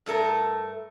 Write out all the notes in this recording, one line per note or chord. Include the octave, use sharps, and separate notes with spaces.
G2 A3 A4 A#4